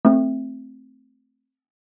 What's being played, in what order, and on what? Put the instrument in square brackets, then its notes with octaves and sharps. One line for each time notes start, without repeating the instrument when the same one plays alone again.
[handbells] A3 C4